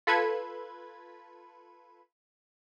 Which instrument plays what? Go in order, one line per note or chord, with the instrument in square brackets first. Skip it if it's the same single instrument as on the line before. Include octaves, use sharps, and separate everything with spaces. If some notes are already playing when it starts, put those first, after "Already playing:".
[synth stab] F4 A4 B4 B5 G#6